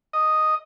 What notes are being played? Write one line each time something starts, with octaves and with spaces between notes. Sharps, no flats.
D#5